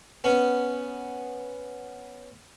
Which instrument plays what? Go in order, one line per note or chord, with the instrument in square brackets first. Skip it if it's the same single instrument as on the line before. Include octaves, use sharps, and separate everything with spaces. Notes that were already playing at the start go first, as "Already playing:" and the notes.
[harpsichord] B3 C#4